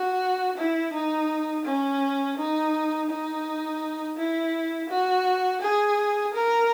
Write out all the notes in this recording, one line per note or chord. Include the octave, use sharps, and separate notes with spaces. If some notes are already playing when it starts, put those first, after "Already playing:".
Already playing: F#4
E4
D#4
C#4
D#4
D#4
E4
F#4
G#4
A#4